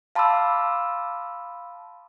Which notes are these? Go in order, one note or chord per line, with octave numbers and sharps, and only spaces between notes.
F5 A5 B5 C6 D6 E6